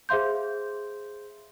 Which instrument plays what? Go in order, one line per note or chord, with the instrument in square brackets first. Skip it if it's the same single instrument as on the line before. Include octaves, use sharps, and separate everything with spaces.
[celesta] G#4 C5 E5 F5 C6 G6